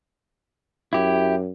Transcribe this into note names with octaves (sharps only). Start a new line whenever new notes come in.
F#2 E4 G4